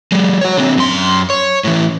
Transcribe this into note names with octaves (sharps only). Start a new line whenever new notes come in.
F#3 G#3
F#4 C#5
D3 C4
F#2 C6
C#5
A2 E3